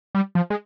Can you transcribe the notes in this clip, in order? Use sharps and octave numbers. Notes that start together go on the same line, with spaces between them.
G3
F3
G#3